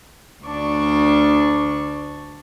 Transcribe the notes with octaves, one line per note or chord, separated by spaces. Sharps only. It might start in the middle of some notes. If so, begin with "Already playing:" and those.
D2 D4 C#6